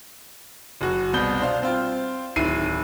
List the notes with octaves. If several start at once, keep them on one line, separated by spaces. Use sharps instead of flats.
F#1 F#4
C2 B2 G6 G7
D4 C5 F5
C4 F4
D1 D#3 E4 C7 D#7